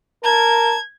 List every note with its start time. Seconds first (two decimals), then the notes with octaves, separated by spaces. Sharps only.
0.24 A#4 A5 G#6